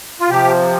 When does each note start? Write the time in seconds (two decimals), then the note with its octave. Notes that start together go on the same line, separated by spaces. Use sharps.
0.20 F4
0.29 C3 F3 G4